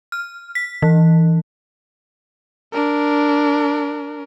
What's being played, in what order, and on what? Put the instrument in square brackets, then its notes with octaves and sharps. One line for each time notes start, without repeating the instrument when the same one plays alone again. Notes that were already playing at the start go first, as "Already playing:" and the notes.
[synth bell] F6
B6
E3
[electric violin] D4 A#4